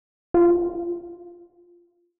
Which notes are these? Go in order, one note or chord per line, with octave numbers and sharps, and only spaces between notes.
F4